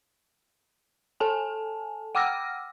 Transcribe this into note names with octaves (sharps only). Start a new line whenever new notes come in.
A4 G#5 A5
F#5 G5 D6 E6 F6 A#6